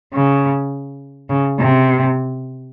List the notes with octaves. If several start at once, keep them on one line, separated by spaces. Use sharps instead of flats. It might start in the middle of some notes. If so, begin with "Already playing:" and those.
C#3
C#3
C3